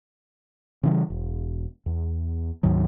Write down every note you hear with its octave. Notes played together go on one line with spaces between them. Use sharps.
C#3 E3 G3
E1
E2
D2 G#2 D#3 F#3